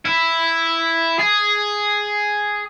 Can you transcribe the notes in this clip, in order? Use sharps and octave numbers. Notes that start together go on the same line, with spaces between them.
E4
G#4